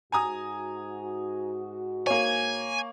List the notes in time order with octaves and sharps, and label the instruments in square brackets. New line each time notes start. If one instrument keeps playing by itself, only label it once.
[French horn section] G#2 F#4 [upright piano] G#5 A#5 D#6
[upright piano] A#3 C#5 [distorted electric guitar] G#5